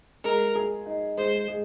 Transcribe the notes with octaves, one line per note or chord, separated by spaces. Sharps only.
G#3 A#4
G#4
D#4
G#3 C5
G#3